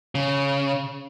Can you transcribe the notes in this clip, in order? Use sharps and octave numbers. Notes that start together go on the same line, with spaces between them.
C#3